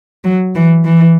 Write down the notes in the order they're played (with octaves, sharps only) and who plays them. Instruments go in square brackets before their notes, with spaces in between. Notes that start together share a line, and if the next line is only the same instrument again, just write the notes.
[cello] F#3
E3
E3